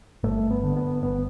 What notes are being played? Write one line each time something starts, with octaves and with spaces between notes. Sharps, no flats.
G1 A3
B3
D3
B3
G1 B3